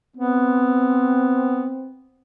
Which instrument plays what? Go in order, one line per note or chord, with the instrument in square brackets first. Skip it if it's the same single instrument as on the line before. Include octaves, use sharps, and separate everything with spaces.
[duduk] B3 [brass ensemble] C4